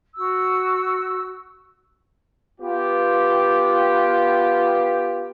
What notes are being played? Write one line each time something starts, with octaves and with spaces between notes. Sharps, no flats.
F#4 E6
B3 F4 G4